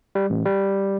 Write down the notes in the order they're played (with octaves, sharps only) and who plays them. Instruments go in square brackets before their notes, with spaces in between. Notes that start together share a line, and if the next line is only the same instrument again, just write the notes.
[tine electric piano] G3
A1
G3